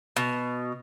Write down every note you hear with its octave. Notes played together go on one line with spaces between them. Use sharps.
B2